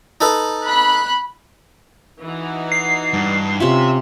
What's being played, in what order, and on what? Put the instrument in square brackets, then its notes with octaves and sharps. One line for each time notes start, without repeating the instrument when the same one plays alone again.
[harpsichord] D#4 A4 B4
[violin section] B5 F#6
[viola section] E3 D#4 F#4
[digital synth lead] C7
[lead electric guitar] G2
[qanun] C3 C#4 F4 [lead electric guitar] E5